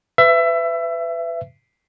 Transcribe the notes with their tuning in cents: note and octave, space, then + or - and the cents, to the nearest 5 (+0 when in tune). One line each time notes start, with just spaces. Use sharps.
B4 +30 E5 +25